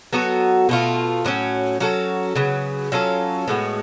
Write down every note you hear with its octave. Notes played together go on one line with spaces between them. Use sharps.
F#3 B3 F#4 A4
B2 A3 F4
A2 F#3 A3 C#4
F#3 C#4 F#4 A4
C#3 F#3 B3
F#3 C#4 F4 A4
A2 G#3 B3 F#4